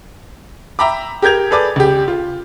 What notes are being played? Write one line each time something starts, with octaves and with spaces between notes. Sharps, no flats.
E5 G5 A#5 B5 D6
G4 A#4 G6 G#6 F7
G#4 A4 B4 D5 D6
C#2 G4
F4